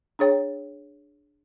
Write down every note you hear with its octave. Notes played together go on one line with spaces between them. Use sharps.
D4 G#4 C#5 G5